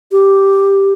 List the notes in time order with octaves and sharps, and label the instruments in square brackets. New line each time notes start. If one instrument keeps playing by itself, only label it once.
[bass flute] G4